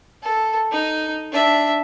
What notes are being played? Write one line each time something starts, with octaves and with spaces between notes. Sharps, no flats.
A4
D#4
D4 E5